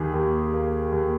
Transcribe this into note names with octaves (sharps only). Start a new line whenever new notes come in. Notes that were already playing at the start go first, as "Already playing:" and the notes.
Already playing: D#2 D#3 G4 G#4
D#2
A#3
D#2